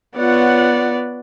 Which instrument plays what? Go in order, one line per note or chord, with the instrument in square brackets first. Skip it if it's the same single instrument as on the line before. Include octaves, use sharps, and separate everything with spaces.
[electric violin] B3 D5 [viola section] F4 C#5 F#5